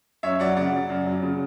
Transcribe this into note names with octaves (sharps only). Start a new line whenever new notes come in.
F#2 C#5 E5
F#3 D5 F#5
C#3 D5 F#5
F#2
F#2
F#3
C#3